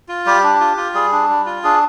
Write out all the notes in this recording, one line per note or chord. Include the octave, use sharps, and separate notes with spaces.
F4
G3 G4
D4
F4
F4
G3 G#4
D4
G3
F4
D4 G#4